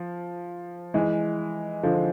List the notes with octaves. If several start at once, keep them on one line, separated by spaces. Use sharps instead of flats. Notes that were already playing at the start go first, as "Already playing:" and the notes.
Already playing: F3
E3 G#3
D3 F3